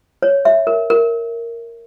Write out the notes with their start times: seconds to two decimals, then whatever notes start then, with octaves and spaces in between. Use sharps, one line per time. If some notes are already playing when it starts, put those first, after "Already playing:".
0.23 C#5
0.45 E5
0.67 A#4
0.90 A#4